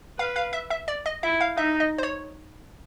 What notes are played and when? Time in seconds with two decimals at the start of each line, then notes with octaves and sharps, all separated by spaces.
0.19 B4 F5
0.36 F5
0.53 E5
0.70 E5
0.88 D5
1.06 D#5
1.23 E4 E5
1.41 F5
1.57 D#4 E5
1.80 D#5
1.98 C5
2.03 C#5